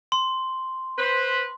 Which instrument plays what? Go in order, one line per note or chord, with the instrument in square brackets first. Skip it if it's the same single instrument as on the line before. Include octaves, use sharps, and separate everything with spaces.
[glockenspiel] C6
[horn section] B4 C5